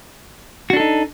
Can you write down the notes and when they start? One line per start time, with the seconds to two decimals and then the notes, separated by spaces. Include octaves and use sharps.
0.70 F#4
0.73 D4
0.76 A4
0.80 D#4